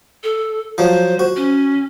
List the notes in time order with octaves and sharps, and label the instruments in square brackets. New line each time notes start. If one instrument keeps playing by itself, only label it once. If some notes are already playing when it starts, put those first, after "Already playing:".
[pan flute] A4
[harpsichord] F3 F#3 [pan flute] C5
[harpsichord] F#4
[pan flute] C#4